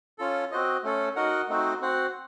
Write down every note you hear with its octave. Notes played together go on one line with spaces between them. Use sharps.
C#4 F4 A4
C4 F#4 C5 D#5
A3 C#4 A4
D#4 F#4 A#4 D#5 F#5
A3 C4 D#4 F#4 C5
C4 F#4 C5 F#5